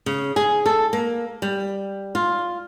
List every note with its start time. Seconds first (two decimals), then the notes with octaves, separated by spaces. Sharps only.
0.06 C#3
0.36 G#4
0.66 A4
0.93 A#3
1.42 G3
2.15 F4